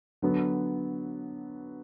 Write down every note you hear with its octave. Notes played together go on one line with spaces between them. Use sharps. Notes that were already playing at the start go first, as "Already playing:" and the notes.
D3 F#3 B3